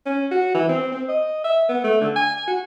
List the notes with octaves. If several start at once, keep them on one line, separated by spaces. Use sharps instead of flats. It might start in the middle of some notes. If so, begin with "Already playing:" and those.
C#4
F#4
E3
C4
C4
D#5
E5
B3
A3
D3
G#5
F#4